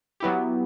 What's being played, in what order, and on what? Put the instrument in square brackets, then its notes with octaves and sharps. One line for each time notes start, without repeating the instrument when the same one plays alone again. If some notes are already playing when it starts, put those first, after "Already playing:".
[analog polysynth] F#3 B3 E4 G4